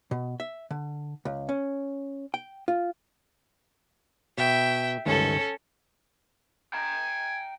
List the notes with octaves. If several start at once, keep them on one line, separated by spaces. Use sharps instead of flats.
B2
E5
D3
C#2
C#4
G5
F4
B2 E5 G5
G1 C#2 D#3 C#4 A4
G5 G#5 A#5